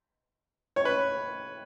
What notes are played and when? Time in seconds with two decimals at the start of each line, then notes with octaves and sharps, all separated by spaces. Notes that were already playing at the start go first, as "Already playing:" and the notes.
0.76 C#5
0.85 B4